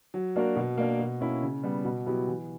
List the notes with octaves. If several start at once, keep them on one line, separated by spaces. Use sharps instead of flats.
F#3
A#3 D4 F#4 A#4
B2
A#3 D4 A#4
B2
A#3 C#4 E4
C#3
G3 B3
B2
F#3 B3 E4 G4
E3